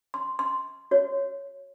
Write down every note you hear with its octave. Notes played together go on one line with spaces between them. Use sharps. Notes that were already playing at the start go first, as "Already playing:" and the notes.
C6
C6
F#4 C#5